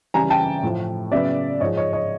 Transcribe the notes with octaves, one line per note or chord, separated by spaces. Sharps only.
C#3 E3 G3 G#5 A#5
G5 A5
A2 F3 A3
C#3 F#3 B3 D5 E5
G#2 F3 G#3 C#5 D#5
C#5 D#5
C#5 D#5